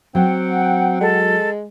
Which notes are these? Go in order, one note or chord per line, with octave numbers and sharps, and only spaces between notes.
F#3 C4 F#5 G5
G#3 A4